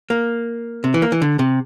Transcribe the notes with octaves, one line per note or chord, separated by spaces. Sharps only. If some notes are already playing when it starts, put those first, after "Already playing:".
A#3
C3
E3
A#3
E3
D3
C3